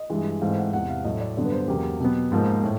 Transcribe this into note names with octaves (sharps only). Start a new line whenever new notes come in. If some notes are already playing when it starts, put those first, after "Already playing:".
Already playing: D#5
G2 E3 G#3
G#2 E3 A3 C4 F5
F#5
E2 C3 E3 F#5
F5
A2 F#3 A3 D#5
D5
G2 D3 F#3 B3 D5
B4
C5
E2 C#3 F#3 A#3 G4
B2 F#3 B3
G#2 F3 A#3
A2